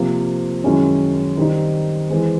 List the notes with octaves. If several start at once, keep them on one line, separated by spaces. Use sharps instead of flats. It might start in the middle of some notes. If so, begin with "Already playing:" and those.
Already playing: C3 F3 A#3
F#2 D#3 G#3 C#4 E4
D#3 G3 C4 D#4
E3 G#3 C4